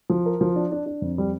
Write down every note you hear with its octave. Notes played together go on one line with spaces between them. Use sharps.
F3
A#4
F3
D4
D4
D4
F2
G3